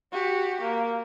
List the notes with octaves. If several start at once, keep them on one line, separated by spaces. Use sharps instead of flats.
F#4 G4
A#3